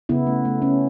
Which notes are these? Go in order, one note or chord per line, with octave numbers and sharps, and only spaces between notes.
C#3 B3 E4
A3
A3
A3 C#4